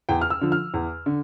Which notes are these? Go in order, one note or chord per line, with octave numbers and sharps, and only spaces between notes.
E2 G5
F6
E6
D3 F3
F6
E2
D3